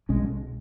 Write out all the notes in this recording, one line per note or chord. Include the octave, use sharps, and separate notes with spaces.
B1 B2 G#3 C#4